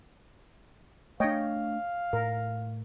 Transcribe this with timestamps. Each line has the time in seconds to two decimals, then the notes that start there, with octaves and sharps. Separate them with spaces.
1.20 A3 D4 C#5 D#5 F5 G5
2.13 A2 A#4